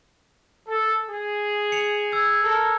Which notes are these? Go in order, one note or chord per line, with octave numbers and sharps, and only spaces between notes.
A4
G#4
C#7 F7
E6 G#6
A4 A#4